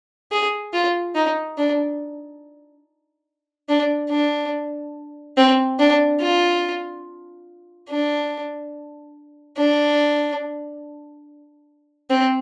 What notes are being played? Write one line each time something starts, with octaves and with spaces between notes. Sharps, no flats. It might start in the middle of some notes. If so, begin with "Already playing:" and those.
G#4
F4
D#4
D4
D4
D4
C4
D4
F4
D4
D4
C4